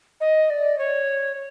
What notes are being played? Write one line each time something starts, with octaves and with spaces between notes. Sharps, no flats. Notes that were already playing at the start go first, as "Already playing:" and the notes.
D#5
D5
C#5